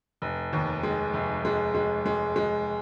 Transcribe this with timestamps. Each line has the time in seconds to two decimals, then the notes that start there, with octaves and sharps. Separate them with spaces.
0.22 F1
0.53 D#2
0.83 G#3
1.14 F1
1.45 G#3
1.75 G#3
2.06 G#3
2.36 G#3